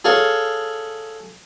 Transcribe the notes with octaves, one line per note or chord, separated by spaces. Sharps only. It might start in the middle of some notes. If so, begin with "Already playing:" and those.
G#4 A4 C#5 F5